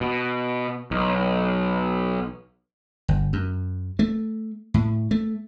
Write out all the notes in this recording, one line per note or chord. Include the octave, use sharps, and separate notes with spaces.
B2
B1
G1
F#2
A3
A2
A3